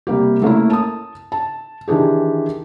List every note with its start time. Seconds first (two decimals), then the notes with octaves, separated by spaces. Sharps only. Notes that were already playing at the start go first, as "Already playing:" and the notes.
0.07 C3 G3 A#3 G4
0.42 A3 A#3 C#4 E4
0.70 A5 D#6
1.32 A5
1.88 D#3 E3 D4 G4 G#4